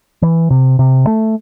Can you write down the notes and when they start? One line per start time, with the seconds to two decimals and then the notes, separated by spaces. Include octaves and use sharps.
0.22 E3
0.50 C3
0.79 C3
1.07 A3